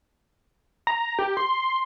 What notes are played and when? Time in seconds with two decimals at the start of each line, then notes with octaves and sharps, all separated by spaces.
0.87 A#5
1.19 G4
1.37 C6